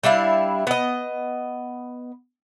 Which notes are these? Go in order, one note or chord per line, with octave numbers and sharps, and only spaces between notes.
G3 D4 E4 F5
B3 D#5